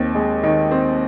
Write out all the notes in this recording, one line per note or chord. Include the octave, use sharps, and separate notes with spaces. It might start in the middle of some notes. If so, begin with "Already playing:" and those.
Already playing: D#2 C4
G#3
D#3
C4